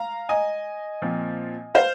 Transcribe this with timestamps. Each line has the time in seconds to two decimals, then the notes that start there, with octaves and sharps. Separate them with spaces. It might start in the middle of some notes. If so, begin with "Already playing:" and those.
Already playing: F5 A#5
0.29 D#5 G#5
1.02 A#2 F3 C4
1.75 C5 F5